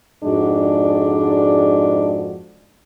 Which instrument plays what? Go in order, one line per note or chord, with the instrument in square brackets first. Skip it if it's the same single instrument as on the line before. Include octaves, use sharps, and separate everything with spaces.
[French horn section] F2 G#2 G#3 D4 F#4 D5